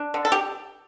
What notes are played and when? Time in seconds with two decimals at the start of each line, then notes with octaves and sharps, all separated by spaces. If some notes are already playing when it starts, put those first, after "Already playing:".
Already playing: D4
0.14 D3
0.25 A4
0.32 G4